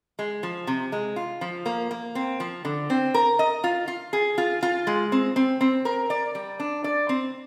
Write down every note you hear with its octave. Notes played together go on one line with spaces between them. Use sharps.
G#3
F3
C3
G#3
F4
F3
A#3
A#3
C4
F3
D3
C4
A#4
D#5
F4
F4
G#4
F4
F4
G#3
C4
C4
C4
A#4
D5
G3
D4
D5
C4